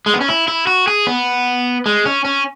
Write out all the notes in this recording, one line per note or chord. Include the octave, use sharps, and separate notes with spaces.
G#3
B3
C#4
E4
E4
F#4
G#4
B3
G#3
C#4
C#4